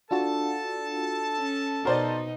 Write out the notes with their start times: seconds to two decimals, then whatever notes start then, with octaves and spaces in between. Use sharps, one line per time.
0.11 D4 F4 F#4 A4 A5
1.38 C#4
1.85 B2 D#4 F#4 A#4 C5 D5